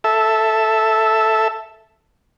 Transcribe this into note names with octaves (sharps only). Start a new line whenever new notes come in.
A4 E5